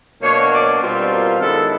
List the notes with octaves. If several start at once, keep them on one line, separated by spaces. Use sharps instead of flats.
B2 F#3 A#3 D4 C#5
D5
B2 G3 C4 F4
A#4
F#2 D#3 G#3 B3 E4 A4